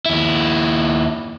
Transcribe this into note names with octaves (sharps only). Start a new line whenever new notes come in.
D#2 E4